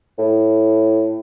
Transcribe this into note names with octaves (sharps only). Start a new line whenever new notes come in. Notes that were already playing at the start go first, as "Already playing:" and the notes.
A2